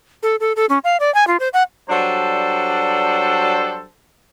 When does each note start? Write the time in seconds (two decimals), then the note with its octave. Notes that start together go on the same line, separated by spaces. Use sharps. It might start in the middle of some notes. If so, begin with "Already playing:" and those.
0.23 A4
0.40 A4
0.56 A4
0.69 C#4
0.84 F5
1.00 D5
1.15 G#5
1.27 F4
1.40 C5
1.54 F#5
1.89 F#3 G3 D4 A4 C5 A5